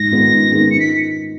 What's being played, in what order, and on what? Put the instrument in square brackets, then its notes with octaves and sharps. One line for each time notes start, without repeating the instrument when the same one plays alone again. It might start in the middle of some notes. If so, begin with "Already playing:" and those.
Already playing: [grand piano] G#2 [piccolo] A#6
[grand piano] D#3 G#3 B3 F4
G#2
D#3 G#3 B3 F4
[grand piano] D#3 [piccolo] C#7
[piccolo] B6